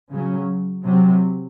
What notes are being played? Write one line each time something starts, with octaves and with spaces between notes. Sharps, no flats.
C#3 F#3 C#4
C3 F#3 C4